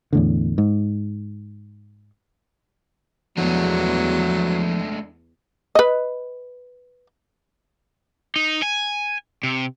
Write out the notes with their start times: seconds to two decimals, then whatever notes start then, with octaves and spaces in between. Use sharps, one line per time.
0.13 E2 A2 D3
0.58 G#2
3.37 E2 F3 F#3 G#3 A3 D4
5.75 B4 D#5
8.36 D#4
8.62 G#5
9.43 C3